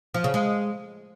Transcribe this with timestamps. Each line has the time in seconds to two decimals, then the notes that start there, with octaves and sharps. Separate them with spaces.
0.14 F3
0.24 C#3
0.34 G#3